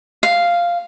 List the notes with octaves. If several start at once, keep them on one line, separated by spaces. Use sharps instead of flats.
F5